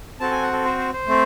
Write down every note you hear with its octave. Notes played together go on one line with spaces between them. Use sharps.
C4 F#4 A4 A5
G#5
F#5
A4
C5
C5
C5
A3 C4